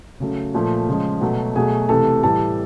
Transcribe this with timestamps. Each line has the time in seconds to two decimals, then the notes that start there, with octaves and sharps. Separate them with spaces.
0.20 C#3 F#3 A3
0.54 A#2 F3 A3
0.88 C#3 F3 G#3
1.21 B2 F#3 A3
1.56 B2 F#3 A3 G#4 G#5
1.89 C3 E3 A3 A4 A5
2.23 A2 E3 G3 A4 A5